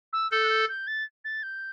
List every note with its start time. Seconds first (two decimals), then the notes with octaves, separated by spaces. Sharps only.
0.13 E6
0.31 A4 G6
0.44 F#6
0.50 G6
0.69 G6
0.87 A6
1.25 A6
1.43 G6